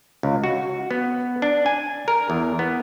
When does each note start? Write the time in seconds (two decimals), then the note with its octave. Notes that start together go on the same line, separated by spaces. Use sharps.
0.23 C#2
0.44 F#4
0.91 B3
1.42 D4
1.66 G#5
2.08 A#4
2.30 E2
2.59 B3